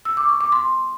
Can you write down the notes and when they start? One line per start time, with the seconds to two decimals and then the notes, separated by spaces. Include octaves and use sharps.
0.05 E6
0.17 D6
0.29 C#6
0.41 D6
0.52 C6